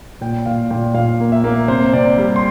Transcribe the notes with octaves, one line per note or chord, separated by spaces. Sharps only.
A#2 G5
A#2 F5
A#2 G5
A#2 F5
A#3
E5
A#3
C3 C5
C3 D5
G3
C6